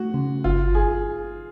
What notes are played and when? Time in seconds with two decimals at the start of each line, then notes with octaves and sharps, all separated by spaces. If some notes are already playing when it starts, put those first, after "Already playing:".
Already playing: A3 F#4
0.14 C#3
0.44 G1 F4
0.75 G#4